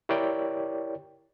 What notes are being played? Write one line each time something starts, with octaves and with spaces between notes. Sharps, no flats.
E4 G4 A#4 C#5 D5 G5